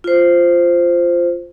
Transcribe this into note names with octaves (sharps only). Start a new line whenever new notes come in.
F4 C5